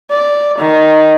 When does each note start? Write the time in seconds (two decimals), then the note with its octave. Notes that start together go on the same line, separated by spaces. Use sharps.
0.11 D5
0.58 D#3